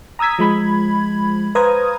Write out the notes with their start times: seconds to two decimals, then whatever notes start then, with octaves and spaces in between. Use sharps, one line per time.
0.19 A#5 D#6 E6 G#6 B6
0.39 F3 G#3 B5 G#6
1.55 B4 C5 F5 A#5 D#6 G#6